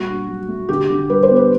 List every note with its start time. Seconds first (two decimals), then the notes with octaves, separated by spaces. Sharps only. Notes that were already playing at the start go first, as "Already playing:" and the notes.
Already playing: A#2 G3 F#4
0.09 D4
0.28 F#3
0.48 A3
0.69 D3 G4
0.90 D3
1.10 G3 B4
1.23 C5
1.30 B3
1.36 B4